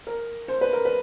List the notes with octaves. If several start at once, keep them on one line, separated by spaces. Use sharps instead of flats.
A#4
C5
B4
A#4
B4